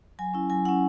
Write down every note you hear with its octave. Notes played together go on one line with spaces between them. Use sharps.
F#3 G#5
C#4 E4
F#3 G#5
C#4 E4 F#5